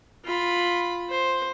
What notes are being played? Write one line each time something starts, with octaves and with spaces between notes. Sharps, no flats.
F4 B5
C5